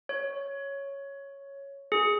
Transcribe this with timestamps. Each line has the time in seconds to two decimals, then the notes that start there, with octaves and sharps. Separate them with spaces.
0.09 C#5
1.92 G#4